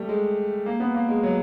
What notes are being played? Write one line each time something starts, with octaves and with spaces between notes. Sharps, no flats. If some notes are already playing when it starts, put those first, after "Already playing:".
Already playing: G3 A3
G#3
A#3
B3
A#3
G#3
F#3